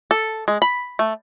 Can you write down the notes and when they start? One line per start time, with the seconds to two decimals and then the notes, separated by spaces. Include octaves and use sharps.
0.11 A4
0.48 G#3
0.62 B5
0.99 A3